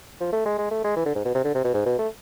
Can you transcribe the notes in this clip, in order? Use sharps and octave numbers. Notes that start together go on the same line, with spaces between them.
F3
A3
G#3
G#3
A3
G#3
E3
D3
G#2
B2
C3
D3
C3
B2
G#2
B2
A3